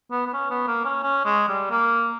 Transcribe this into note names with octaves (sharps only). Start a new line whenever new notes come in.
B3
B3
C#4
B3
A#3
C#4
C#4
G#3
G3
A#3